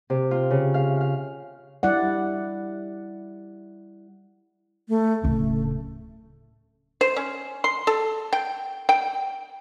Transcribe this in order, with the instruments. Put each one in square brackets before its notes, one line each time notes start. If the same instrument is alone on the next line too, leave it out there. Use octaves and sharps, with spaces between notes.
[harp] C3
F4
C#3
F5
F5
[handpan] G3 E4 D5 F#5
[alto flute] A3
[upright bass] D1 C#3 [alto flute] A3
[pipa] C5
C#4
C6
A4
G5
G5